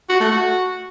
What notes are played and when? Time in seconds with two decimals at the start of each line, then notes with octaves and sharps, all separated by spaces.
0.09 F#4
0.20 A3
0.31 F#4